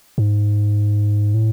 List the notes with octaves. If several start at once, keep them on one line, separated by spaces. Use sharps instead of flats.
G#2
A2